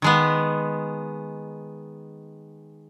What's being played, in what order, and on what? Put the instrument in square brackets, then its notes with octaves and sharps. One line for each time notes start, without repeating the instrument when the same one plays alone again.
[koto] D#3 G#3 B3